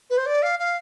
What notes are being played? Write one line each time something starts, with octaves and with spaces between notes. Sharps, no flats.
B4
C5
D5
F5
F5